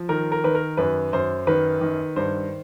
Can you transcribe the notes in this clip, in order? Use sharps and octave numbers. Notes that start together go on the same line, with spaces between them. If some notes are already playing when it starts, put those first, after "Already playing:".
Already playing: F3
D#3 A#4
A#4
D#3 B4
A#4
F#2 B4
F#2 C5
D#3 B4
D#3
G2 C5